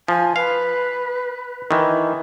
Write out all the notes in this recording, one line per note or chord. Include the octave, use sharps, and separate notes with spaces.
F3 G#5
B4 F5
D#3 E3